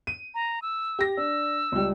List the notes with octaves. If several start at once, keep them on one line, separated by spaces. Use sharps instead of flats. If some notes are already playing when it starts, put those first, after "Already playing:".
D#7
A#5
E6
G4 A#6
D4 E6
C#2 G3